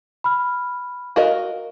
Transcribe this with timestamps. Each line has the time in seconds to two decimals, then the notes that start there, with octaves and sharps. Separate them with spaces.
0.24 B5 F6
1.16 F#4 A#4 D#5 F5